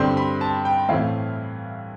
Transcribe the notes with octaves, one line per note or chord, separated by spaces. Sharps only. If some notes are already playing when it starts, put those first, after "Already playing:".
Already playing: G2 D3 G3 C4 C6
B5
A5
G5
A2 E3 A3 C4 F5